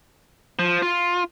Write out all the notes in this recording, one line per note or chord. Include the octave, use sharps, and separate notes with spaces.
F3
F4